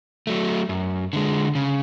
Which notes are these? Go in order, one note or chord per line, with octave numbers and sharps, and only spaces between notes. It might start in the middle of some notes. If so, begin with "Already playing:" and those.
F#3 A3
F#2
D3 G#3
C#3